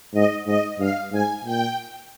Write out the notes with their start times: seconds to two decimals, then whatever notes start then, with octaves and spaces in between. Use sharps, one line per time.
0.14 G#2 D#5
0.46 G#2 D#5
0.79 G2 F5
1.12 G#2 G#5
1.44 A#2 G5